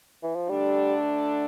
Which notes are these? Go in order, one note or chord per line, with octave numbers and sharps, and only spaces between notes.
E3
F3
D2 D3 G3 A3 D4